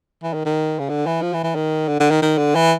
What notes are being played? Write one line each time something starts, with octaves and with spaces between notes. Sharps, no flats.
E3
D#3
D#3
C#3
D3
E3
F3
E3
E3
D#3
D3
D3
D#3
D#3
D3
E3